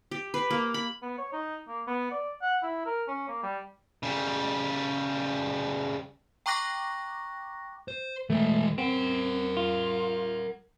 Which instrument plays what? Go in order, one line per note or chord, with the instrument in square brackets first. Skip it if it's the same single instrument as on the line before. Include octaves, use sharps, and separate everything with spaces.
[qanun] G4
B4
A#3
B5
[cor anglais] B3
C#5
D#4
A#3
B3
D5
F#5
E4
A#4
C#4
A#3
G3
[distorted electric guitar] C#3 G3
[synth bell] G5 A#5 C#6 D6 F#6 A#6
[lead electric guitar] C5
[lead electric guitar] E3 G#3 [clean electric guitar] A3
[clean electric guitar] C4 [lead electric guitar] A#4 F#5
[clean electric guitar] F4